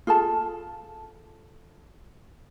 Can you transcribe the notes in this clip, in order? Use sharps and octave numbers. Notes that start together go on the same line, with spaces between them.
F4 G#4 A4 A5